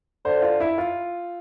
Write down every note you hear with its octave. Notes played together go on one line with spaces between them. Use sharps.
D3 C5
F4
E4
F4